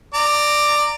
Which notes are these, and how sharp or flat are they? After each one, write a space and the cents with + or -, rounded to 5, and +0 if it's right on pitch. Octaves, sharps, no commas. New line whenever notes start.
D5 +10 A#5 -15